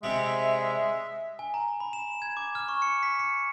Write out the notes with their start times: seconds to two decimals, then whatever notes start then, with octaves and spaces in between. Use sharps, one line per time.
0.03 C3 G3 G#3 E5
1.39 G#5
1.54 A#5
1.80 B5
1.93 E7
2.22 G#6
2.37 D6
2.55 F6
2.68 C#6
2.82 C#7
3.03 B6
3.19 C#7